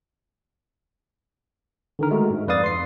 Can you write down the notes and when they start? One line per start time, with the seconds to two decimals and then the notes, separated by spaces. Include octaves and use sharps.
1.99 D3 D#3 A#4
2.11 G#3 A3 F#4
2.31 G#2
2.48 F2 B4 D5 F5 D#6 A6
2.64 C6 C7